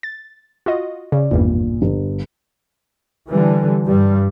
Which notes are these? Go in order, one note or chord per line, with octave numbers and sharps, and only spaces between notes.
A6
F4 F#4 D#5
C#3 D5
G#1 E2 G2 A#2
G1
D3 E3 G3
G2 G3